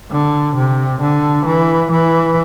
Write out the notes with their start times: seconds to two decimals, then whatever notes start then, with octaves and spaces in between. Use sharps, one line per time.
0.11 D3
0.56 C3
1.01 D3
1.46 E3
1.91 E3